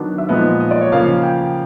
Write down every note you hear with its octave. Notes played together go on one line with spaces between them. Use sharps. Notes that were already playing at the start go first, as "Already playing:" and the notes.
Already playing: D#3 F#3 B3 D4
E5
A#2 F3 G#3 B3 D#4 D#5
D#5
D5
C#5
C#3 F3 A#3 F5
G5